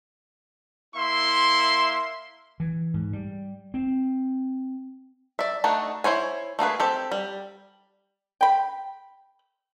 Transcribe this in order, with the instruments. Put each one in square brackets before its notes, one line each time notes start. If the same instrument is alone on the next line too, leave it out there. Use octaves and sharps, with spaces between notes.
[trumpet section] A#3 E4 E5 C6
[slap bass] E3
G#2
G3
C4
[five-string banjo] D5 E5
A3 D4 D#4 F#4
E4 C5 C#5 G#5
A3 A#3 G#4 B4
C4 G4 A4
G3
[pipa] G5 B5